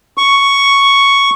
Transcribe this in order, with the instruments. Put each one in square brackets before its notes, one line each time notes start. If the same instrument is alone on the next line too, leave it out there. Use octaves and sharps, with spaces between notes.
[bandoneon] C#6